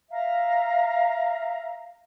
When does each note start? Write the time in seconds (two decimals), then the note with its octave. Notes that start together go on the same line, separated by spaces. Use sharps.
0.11 E5 F5 A#5